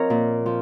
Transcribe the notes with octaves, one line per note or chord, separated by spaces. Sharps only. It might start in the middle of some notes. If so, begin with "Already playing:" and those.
Already playing: F3 C4 A#4 C#5 D#5 F5
A#2
F3